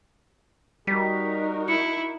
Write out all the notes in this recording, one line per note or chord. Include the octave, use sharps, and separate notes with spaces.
G3 D#4 F#4 A#4 B6
E4 C#7